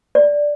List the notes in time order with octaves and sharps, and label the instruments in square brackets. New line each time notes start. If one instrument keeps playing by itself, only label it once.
[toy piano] D5